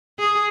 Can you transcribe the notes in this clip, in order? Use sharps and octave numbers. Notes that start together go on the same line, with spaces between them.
G#4